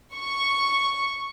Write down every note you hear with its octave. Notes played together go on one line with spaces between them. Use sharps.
C#6